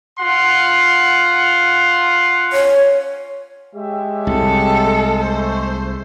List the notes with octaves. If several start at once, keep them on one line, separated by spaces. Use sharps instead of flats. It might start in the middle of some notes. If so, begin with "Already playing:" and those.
F4 F#5 C6
C#5
G#3 G4 C#5 E5
C2 A4
A3 C5